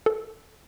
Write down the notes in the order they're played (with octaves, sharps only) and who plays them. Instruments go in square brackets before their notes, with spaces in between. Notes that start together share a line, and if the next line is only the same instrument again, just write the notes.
[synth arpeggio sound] A4